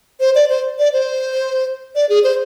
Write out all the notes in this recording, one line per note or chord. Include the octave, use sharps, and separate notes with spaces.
C5
D5
C5
D5
C5
D5
G#4
C5